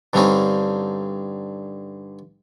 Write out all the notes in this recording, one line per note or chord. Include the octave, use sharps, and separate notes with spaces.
G2 D3 G3 C4 C#4 D#4